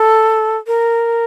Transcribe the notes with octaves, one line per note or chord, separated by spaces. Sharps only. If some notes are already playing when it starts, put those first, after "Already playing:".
Already playing: A4
A#4